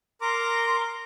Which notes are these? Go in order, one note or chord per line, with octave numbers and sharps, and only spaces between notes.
A#4 A#5 C6 D6